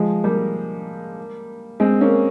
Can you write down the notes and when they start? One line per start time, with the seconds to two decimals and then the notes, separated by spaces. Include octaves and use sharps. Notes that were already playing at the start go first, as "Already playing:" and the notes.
Already playing: F3 G#3
0.24 G3 A#3
1.80 G#3 C4
2.01 A#3 C#4